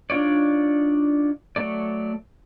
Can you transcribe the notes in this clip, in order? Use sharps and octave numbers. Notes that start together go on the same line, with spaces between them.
D4 D#4 F4 C#5 D5
F#3 A3 A4 D5